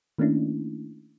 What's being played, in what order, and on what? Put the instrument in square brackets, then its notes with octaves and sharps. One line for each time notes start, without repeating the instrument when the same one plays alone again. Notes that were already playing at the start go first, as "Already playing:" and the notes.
[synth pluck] D#3 A3 A#3 C#4 D4 E4